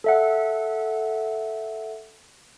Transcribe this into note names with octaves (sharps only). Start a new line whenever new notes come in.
A4 E5 F#5